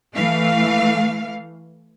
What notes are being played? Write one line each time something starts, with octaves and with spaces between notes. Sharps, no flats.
E3 A3 F5